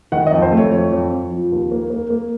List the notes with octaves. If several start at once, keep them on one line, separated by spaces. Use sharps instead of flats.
D#3 F#5
D#5
F2
C5
A3
C#5
F2 C#5
F2
F2
F3
D#2
A#3
A#3
A#3